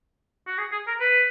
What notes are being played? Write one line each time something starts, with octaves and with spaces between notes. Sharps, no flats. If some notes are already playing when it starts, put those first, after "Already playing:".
F#4
G#4
G#4
A#4
B4